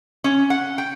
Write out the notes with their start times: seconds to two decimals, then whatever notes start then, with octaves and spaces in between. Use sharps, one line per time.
0.24 C#4
0.50 F#5
0.78 G5